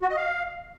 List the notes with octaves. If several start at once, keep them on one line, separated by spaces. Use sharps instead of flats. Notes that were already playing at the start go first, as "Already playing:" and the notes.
F#4
D#5
F5